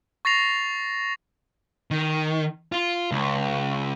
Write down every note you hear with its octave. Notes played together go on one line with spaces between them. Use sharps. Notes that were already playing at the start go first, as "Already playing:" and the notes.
C#6 A6 A#6 C7 F7
D#3
F4
C#2